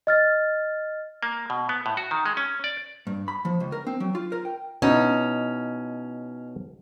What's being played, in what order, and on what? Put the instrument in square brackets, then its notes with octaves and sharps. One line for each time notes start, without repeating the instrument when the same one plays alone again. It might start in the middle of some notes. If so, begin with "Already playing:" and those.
[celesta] D#5 F6 A6
[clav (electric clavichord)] A#3
B2
B3
A2
F#4
D#3
G#3
C#4
D5
[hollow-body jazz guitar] G2
B5
F3
C#2
A#4
C4
F#3
F4
A#4
G5
[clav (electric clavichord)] B2 D#4 E4 [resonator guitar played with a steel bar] C#4